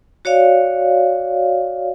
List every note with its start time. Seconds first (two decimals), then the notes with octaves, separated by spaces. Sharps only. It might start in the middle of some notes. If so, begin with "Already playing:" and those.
0.25 F#4 C#5 D5 F5